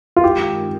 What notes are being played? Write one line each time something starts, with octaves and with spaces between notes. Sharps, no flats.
F4
G2 D#3 G#3 C4 G4